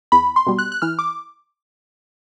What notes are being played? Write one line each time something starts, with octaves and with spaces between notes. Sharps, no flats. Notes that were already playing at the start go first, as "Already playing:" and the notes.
E2 B5
C6
B2 G3
F#6
F#6
E3 F6
D6